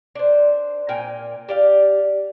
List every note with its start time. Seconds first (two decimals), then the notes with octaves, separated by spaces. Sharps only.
0.15 D4 C5
0.89 A#2 A#4 G5 G#5
1.49 G4 D5 F5